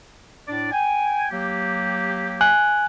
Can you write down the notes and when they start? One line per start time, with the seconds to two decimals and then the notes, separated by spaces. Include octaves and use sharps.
0.48 A2 D4 D5
0.72 G5 G#5
1.31 F#3 A#3 G4
2.41 G#5 F#6